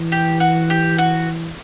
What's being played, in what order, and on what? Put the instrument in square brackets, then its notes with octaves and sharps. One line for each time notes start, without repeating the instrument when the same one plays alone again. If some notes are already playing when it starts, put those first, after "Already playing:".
Already playing: [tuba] E3
[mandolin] G4
F#4
G4
F#4